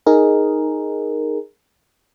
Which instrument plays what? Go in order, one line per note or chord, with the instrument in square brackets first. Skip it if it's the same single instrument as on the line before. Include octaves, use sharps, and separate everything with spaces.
[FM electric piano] D#4 G#4 A#4